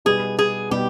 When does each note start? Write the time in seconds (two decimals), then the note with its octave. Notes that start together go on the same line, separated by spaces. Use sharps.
0.05 B2 G3 B3 D#4 G#4
0.39 G#4
0.71 B2 G3 B3 D#4 G4